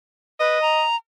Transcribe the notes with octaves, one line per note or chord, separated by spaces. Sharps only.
B4 D#5
A#5